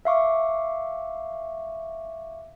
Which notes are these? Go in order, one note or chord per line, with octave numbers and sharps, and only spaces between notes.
E5 F5 C#6 D6